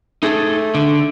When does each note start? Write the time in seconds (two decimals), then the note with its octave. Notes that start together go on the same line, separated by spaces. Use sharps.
0.23 A3 D#4 G#4 A4
0.75 D3